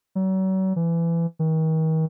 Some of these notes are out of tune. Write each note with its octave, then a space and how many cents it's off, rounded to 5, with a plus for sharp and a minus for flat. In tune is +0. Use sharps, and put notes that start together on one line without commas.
F#3 +40
E3 +25
D#3 +40